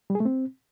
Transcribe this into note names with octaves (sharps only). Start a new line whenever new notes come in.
G3
G#4
A3
C4